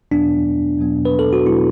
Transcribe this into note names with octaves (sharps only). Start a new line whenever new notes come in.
E2 B2 F#3 B3 D4
E2 B2 F#3 B3
B4
A4
F#4
B2 F#3 B3 E4